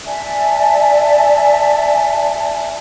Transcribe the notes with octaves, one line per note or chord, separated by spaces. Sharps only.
D5 E5 G#5 A5